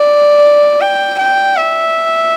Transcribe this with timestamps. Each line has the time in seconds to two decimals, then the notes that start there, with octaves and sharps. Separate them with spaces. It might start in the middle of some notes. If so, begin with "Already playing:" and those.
Already playing: D5
0.81 G5
1.18 G5
1.56 E5